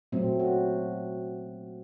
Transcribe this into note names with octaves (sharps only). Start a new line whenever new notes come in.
A#2 F#3 A3 C4
F#4